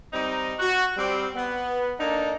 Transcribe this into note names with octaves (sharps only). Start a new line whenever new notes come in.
G3 C4 D#4
F#4
G3 C4
B3
A#3 D4 D#4 A4